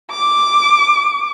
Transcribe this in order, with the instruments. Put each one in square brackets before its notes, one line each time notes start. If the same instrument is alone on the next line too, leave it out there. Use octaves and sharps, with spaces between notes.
[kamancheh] D6